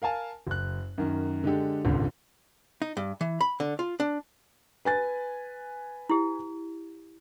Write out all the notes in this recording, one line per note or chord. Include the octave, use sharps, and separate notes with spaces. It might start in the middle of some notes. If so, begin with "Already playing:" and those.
A#4 F5 G#5 A5
F#1 F#6
F#2 D#3
D3 G#3 D4 G4 A4
D#1 G#1 C#2 D3
D#4
G2
E3
B5
D3
F4
D4
B4 G#5 A6
E4 G4